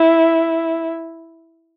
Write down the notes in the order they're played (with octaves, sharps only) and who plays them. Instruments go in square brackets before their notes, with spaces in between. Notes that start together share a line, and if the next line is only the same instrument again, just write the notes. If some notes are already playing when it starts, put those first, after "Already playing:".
Already playing: [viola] E4